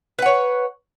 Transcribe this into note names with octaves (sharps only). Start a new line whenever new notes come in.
B4 C#5 F#5